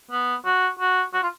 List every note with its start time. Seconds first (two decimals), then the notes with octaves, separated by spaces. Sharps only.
0.11 B3
0.45 F#4
0.79 F#4
1.13 F#4
1.23 F4